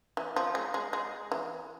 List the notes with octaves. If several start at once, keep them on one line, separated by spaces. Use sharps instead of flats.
E3
F3
G#3
G#3
G#3
E3